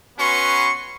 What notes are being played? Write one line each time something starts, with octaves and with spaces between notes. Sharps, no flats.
B3 C#4 F#4 B4 C6 C#6